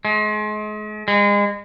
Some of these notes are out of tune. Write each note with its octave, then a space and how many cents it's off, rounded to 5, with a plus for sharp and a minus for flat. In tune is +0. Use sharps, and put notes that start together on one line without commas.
G#3 +35
G#3 -30